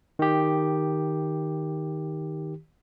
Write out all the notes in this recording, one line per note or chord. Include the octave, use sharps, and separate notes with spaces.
D#3 G4